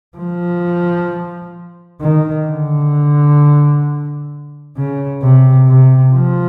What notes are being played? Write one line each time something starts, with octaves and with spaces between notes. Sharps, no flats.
F3
D#3
D3
C#3
C3
C3
F3